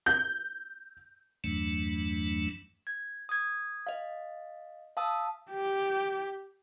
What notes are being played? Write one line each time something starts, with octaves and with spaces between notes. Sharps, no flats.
G6
E2 G2 E3 F#3 A3 D4
G#6
D#6 G#6
D#5 F5
F5 A5 D#6 E6
G4